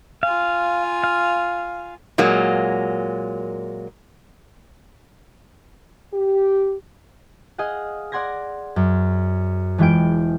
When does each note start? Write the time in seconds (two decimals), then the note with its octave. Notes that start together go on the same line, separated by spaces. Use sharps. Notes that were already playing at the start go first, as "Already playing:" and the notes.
0.23 F4 F5 G#5
1.04 F5
2.18 A#2 F#3 G#3 A#3
6.14 G4
7.58 G#4 D#5 F5 F#5
8.12 D5 F#5 C6 G#6 A#6
8.76 F#2
9.78 E1 E3 G#3 F4 G5 D7